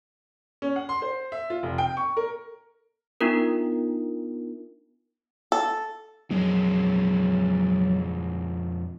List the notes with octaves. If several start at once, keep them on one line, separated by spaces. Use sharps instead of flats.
C#4
F#5
C6
C5
E5
F4
F1
G5
C#6
A#4
B3 D4 D#4 F4 A#4
A4
F2 F#3 G#3